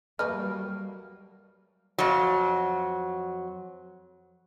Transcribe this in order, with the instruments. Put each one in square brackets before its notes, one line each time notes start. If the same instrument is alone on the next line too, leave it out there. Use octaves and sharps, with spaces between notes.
[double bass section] F#3 G3 A#3 [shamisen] A3 B4 D#5 [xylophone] F6
[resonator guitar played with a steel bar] F2 F#3